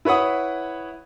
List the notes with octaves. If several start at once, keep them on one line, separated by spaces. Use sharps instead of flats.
E4 B4 C#5 F#5 D#6